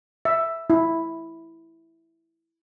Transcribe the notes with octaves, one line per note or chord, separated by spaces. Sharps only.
E5
E4